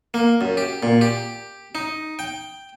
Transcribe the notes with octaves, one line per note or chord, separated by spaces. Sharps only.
A#3
F#2
G4
A#2
G4
D#4
G5